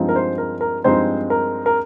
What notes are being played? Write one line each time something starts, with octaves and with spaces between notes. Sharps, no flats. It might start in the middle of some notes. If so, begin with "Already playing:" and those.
Already playing: G2 F3 G#3 C4 D#4
A#4
C5
A#4
A#4
G2 F3 G#3 C4 D#4 C5
A#4
A#4